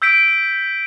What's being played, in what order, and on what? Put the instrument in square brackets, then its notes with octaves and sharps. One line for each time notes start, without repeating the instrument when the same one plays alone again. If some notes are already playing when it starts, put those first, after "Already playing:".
[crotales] E6 G6 B6 D7